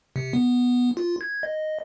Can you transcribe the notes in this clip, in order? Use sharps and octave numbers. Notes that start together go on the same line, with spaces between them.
C3
B3
F4
G#6
D#5